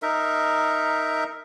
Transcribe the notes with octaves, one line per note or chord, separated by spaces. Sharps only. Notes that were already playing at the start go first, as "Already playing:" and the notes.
D#4 A#4 E5